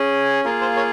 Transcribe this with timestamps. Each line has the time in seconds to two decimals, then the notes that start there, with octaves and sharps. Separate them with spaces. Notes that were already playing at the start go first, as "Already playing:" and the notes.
Already playing: C#4 G#4
0.44 A#3 F4 G#4 A#4
0.61 C5
0.76 A#4 C#5